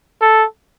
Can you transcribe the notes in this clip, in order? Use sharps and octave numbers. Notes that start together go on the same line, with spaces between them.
A4